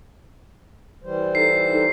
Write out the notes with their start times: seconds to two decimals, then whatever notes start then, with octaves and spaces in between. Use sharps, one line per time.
1.04 E3 G3 C5
1.35 D#4 A4 C7